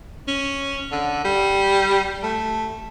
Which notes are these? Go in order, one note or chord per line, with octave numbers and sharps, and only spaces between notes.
C#4
D3
G3
A3